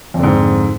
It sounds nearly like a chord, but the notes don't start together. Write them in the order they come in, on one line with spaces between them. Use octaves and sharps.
F2 D3 G#2